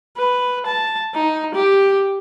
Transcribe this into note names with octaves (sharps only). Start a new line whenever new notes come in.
B4
A5
D#4
G4